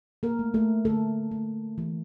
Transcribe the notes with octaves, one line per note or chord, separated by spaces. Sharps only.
A#3 A#4
A3
A3 A4
D3 A3 A4
A3
E3